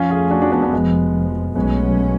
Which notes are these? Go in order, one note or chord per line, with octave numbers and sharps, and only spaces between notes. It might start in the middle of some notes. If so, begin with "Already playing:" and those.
Already playing: F2 F3 A3 C#4 F4
F4 G#4
D4 F#4
D4 F#4
B3 D4
B3 D4
F1 F2 F3 G#3 B3
B1 B2 F#3 G#3 A3 B3 C#4